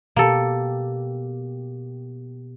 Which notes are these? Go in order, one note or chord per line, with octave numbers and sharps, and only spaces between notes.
B2 A#3 G4 A4